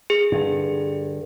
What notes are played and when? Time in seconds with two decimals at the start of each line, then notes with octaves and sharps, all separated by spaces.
0.10 G#4
0.32 G2 D3